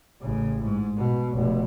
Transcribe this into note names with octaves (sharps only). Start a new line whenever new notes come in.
A1 C#3
G#2
B2
F1 B2